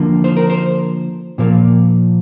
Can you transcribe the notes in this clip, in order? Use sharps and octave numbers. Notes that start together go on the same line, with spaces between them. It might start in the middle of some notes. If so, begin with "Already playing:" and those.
Already playing: D3 F3 A#3
C5
A#4
C5
A#2 F3 A#3